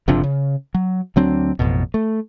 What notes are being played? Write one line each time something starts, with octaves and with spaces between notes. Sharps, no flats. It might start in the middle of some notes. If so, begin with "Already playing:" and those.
F#1 C3 F3 D4
C#3
F#3
D2 F#3 C4 D4
A1 F2 B2
A3